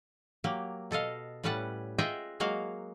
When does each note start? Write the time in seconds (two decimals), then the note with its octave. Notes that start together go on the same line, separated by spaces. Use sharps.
0.44 F#3 A#3 G4
0.91 B2 A4 D#5 F5
1.43 A2 G3 C#4 B4 F#5 A5
1.98 F4 G#4 D#5 E5 F#5 G5
2.40 F#3 G#3 A#3 F#4 F5